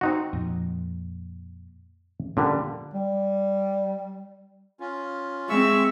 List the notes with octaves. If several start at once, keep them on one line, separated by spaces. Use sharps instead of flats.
C4 D#4 F#4
F2 A#2
A#2 D3 G3 C#4
G3
C#4 F4
G#3 C4 E5 C#6 E6